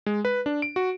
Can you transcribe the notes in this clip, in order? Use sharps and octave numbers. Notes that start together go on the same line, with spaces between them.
G#3
B4
D4
D7
F#4